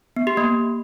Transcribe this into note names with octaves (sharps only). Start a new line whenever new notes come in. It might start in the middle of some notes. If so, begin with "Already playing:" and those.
B3
G4
A#3